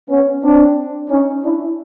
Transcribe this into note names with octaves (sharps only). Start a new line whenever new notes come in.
B3 C#4
C4 D4
C#4 D#4
D4 E4